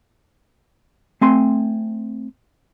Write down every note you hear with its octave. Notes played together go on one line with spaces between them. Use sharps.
A3 C4 G#5 C6